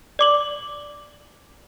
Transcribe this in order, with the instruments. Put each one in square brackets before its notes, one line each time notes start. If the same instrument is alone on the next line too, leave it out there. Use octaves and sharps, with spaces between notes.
[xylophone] D5 D6 F#7